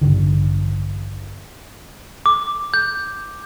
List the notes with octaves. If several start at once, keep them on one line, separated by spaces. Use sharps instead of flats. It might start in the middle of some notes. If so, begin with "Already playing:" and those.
A1 G2 D3 D#3
D6
G6